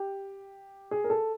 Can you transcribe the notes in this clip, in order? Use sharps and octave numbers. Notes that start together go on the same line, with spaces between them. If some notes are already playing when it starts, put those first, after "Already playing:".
Already playing: G4
G#4
A#4
A4